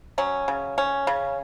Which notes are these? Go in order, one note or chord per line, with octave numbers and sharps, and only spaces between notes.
F#3 C#4
C#3
C#4
C#3